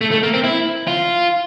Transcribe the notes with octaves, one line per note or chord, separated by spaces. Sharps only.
A3
A3
A#3
C4
E4
F4